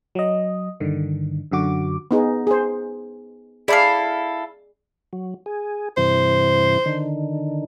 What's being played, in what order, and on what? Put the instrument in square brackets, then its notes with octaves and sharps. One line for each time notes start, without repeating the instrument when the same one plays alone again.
[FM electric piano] F#3 D#5
G2 D3 D#3
F#2 D3 F#4 D6
[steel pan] B3 D#4 G#4
G#4 C5
[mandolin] E4 A4 F5 [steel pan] G#4 D5 B5
[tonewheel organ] F#3
G#4
[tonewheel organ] G2 C3 E3 [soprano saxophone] C5
[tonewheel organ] D3 D#3